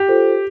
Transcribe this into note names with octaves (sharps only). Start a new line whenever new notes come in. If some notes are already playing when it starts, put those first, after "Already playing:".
Already playing: G4
F4 A4 C5